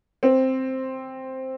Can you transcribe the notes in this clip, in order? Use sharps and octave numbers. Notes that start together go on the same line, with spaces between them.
C4